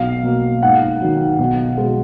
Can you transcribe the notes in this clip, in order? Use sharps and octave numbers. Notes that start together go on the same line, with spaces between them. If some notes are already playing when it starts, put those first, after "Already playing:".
Already playing: B1 F5
B2 A#3
G#2 F#5
D#3 F#3
B1
B2 G#3